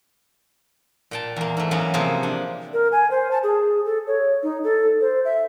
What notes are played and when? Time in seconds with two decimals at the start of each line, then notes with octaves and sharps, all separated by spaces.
1.11 A#2 G5 A5
1.36 E2 A#3
1.57 G#2 A3
1.71 E3 F#3 A#3 B3 C#4
1.94 C3 F3 A#3 G#4 C5
2.23 D4
2.73 A#4
2.92 G#5
3.11 C5
3.31 A5
3.43 G#4
3.85 A4
4.07 C#5
4.43 D#4
4.64 A4
5.01 C5
5.25 E5